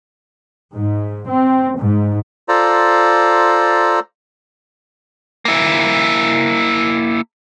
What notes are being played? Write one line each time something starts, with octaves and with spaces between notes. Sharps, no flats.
G#2
C4
G#2
F4 A4 C5 D5 A#5
A#3 E4